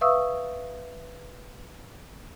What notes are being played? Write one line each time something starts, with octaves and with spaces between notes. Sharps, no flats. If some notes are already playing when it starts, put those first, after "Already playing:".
B4 E5 F5 C#6 D#6 E6